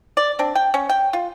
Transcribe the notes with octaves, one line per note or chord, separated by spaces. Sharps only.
D5
C4 D4
G5
C#4
G5
F4